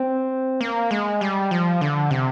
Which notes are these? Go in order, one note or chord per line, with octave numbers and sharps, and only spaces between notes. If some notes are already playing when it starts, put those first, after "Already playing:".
Already playing: C4
A#3
G#3
G3
F3
D3
C3